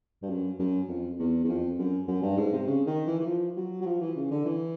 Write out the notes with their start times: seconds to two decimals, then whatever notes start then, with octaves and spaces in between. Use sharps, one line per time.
0.22 G2
0.29 F#2
0.59 F#2
0.89 F2
1.19 E2
1.44 E2
1.49 F2
1.79 F#2
2.08 F#2
2.22 G2
2.38 G#2
2.53 C3
2.67 C#3
2.87 D#3
3.07 E3
3.20 E3
3.26 F3
3.57 F#3
3.81 F#3
3.86 F3
4.01 E3
4.16 C#3
4.31 D3
4.46 E3